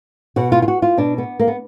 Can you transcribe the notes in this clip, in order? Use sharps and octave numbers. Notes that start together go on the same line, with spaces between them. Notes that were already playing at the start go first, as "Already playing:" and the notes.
B2 F#4
F4
F4
F#4
F4
B2 D4
B3
A#3
B3